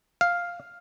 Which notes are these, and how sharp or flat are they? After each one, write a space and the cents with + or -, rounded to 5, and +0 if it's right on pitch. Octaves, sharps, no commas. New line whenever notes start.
F5 +0